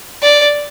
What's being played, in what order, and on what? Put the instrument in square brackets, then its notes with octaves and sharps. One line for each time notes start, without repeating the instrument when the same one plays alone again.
[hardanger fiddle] D5